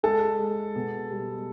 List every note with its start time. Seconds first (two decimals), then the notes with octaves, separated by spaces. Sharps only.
0.03 G#3 A4
0.39 G#3
0.76 B2
1.11 G3